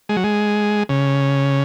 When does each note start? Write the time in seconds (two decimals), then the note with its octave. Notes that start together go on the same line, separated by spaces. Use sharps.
0.09 G#3
0.17 F#3
0.24 G#3
0.89 C#3